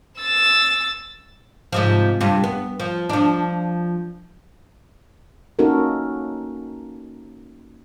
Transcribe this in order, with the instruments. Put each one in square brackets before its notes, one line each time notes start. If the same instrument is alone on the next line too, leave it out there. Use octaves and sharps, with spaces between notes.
[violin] E6 A6
[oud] G#2 C3 F3
G2 C3 F4
B3
F3
F3 D4
[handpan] A#3 C#4 D#4 F#4 A4 A#4